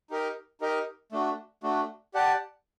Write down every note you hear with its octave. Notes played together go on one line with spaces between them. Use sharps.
D#4 G4 A#4 D#5
D#4 G4 A#4 D#5
A3 D4 F#4
A3 D4 F#4
G4 D5 F#5 A5